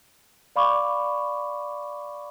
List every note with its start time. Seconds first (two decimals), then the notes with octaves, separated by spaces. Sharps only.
0.56 D5 F5 B5 C#6 D6